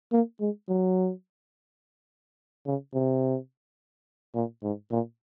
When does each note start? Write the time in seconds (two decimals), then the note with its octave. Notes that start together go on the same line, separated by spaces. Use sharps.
0.13 A#3
0.41 G#3
0.69 F#3
2.66 C#3
2.94 C3
4.35 A#2
4.63 G#2
4.91 A#2